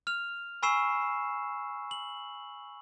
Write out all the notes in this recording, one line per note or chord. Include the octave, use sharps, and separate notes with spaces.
F6 F7
G#5 B5 C#6 E6 C7 E7
F#7